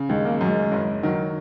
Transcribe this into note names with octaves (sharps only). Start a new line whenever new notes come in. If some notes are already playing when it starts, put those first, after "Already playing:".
Already playing: C#3
D#2 G#3
A#3
G#3
F#2 F#3
G#3
F#1
D#3 F#3